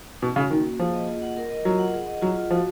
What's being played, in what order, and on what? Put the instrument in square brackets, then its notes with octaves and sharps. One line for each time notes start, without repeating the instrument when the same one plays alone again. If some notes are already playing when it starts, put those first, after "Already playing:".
[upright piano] B2 [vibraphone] C#4
[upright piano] C#3 [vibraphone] F#4
[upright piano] D#3 [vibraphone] A#3
[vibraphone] A#3
[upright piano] F3 [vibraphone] G#4
[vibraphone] D#5
F4
F#5
A#4
D#5
[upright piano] F#3 [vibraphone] F4
[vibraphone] F#5
G#4
D#5
[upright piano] F#3 [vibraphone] F4
[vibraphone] F4
[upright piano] F3 [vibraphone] F#4